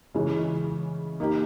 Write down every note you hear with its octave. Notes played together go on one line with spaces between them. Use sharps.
C#3 E3 G#3 C#4
A#3 D#4 G4